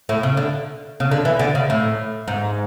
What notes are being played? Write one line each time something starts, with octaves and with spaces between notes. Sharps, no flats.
A2
C#3
D3
C#3
D3
E3
D3
C#3
A2
G#2